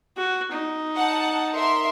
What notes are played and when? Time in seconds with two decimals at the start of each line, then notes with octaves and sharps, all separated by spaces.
0.17 F#4
0.52 D#4
0.96 F#5 A5
1.54 A#4 E5 C6